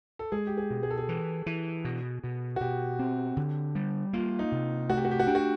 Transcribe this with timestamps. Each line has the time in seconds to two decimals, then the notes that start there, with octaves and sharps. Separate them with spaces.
0.19 A4
0.32 G#3 G#4
0.47 G4
0.57 G#4
0.70 B2
0.83 G#4
0.90 A4
0.98 G#4
1.09 E3
1.46 E3
1.85 B2
2.24 B2
2.56 F#4
2.61 B2 G4
2.99 C4
3.37 D3
3.75 G3
4.13 A#3 F4
4.39 D#4
4.52 C3
4.89 A3 F#4
4.97 G4
5.05 F#4
5.11 G4
5.20 F#4
5.27 D4 G4
5.35 F#4